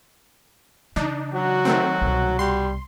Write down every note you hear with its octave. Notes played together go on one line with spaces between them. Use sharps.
C#3 E3 D4 D#4
F#3 F#4
D#3 A3 C4
C2 B2
G3 C6